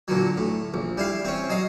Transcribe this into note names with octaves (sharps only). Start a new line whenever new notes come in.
A#2 D3 F#3
A2
A#1
G3 E4 F5
C4 C#4
F#3 D#5 F5